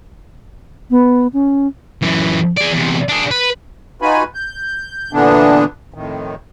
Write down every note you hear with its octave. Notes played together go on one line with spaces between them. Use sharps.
B3
C#4
F#2 E3
G#4 D5
E2 C3
D4 G#4
B4
D#4 F4 F#4 B4 G#5 B5
G6
A#2 D3 E3 B3 D4
F2 A2 D#3